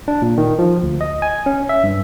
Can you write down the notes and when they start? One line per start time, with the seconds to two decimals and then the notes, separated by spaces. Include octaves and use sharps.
0.08 D4
0.22 A#2
0.38 D#3
0.59 F3
0.83 D2
1.01 D#5
1.22 G#5
1.46 C#4
1.69 E5
1.84 G2